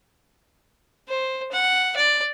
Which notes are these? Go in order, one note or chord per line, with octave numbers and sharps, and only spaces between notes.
C5
F#5
D5